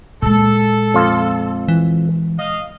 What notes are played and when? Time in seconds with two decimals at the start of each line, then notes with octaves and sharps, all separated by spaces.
0.22 A#2 G#3 A4
0.94 F2 F4
1.68 E3
2.38 D#5 F5